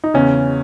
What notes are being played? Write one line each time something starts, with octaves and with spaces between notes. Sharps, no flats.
D#4
E2 C#3 C#4